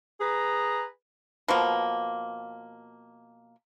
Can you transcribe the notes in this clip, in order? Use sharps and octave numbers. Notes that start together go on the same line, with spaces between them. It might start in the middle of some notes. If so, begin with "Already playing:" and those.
G#4 B4 A#5
B2 F3 A#3